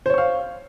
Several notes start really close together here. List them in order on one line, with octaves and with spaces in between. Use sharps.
C5 C#5 C#6 F5